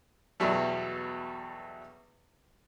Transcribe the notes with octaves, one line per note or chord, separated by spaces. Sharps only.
E2 B2 F#3 G3 A3